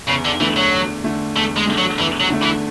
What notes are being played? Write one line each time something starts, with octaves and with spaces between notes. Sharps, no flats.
E2 C#3
D3
D3 E3 A3
F#3
E2
D3 A3
E2 A3
G#3
D3 A3
F#3
E2 E3
F#3
D3 A3
E3